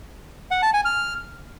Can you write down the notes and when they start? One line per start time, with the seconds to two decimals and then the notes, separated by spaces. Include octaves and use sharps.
0.51 F#5
0.62 A5
0.74 G#5
0.85 F6